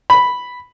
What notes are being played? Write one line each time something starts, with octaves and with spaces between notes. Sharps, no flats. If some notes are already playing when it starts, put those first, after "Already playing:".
B5